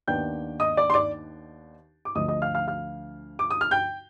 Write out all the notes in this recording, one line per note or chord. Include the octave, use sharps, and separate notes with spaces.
D#2 D#3 B3 D4 G5 G6
D#5 D#6
D5 D6
C6
D5 D6
D6
D2 D3 F3 D#5 D#6
D#5 D#6
F5 F6
F5 F6
F5 F6
D6
D#6
F6
G5 G6